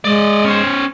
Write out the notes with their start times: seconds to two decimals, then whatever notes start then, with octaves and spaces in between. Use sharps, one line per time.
0.04 G#3 D5 D#5
0.44 C#4 C5